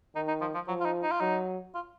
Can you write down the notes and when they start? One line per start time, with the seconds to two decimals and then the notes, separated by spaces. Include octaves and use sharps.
0.15 D#3 D#4
0.28 D#4
0.41 F3
0.54 F3
0.68 F3 F#3
0.81 F4
0.85 D#4
1.03 D#4
1.12 F4
1.20 F#3 D#4
1.75 F4